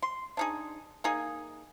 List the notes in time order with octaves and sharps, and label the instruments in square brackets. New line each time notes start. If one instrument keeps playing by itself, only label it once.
[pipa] C6
D4 D#4 G#4
A#3 D#4 G#4